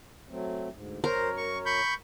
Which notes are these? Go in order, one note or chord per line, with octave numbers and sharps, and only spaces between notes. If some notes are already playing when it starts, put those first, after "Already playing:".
F#3 A3 C4
D2 G#2
F#2 A#4 C5 C#5
C#6
B5 C#6 G6